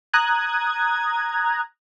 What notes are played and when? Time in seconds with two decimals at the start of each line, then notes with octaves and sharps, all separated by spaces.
0.13 A#5 D#6 F#6 G#6